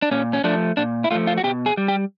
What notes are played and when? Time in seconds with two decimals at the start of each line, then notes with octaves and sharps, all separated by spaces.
0.02 D4
0.11 A#2 C#4
0.33 C#4
0.44 F3 A3 D4
0.77 A#2 D4
1.04 E4
1.11 F3 A3 F4
1.27 F4
1.38 F#4
1.44 B2 G4
1.66 G#4
1.77 G3
1.88 G4